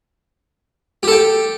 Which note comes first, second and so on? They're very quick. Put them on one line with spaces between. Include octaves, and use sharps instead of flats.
G4 A4 G5